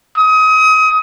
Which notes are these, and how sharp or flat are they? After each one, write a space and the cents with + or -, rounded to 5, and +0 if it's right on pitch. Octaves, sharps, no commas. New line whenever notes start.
D#6 +30